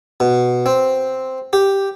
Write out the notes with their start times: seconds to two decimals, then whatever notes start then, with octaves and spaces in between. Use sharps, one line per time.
0.20 B2
0.66 C4
1.53 G4